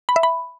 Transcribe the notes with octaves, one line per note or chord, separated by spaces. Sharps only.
B5
E5
B5